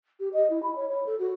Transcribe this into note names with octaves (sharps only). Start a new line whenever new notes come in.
G4
D#5
E4
B5
C#5
C#5
A4
F#4